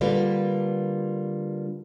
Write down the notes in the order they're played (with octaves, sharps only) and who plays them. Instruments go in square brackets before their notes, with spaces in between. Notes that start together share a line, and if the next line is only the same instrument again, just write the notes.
[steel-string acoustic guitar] D3 G3 A#3 F4 B4